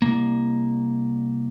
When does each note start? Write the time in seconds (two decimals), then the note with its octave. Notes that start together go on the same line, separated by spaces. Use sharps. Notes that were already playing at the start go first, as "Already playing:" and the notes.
0.02 C2 G2 A#3